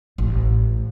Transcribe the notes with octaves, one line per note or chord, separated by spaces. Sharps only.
A1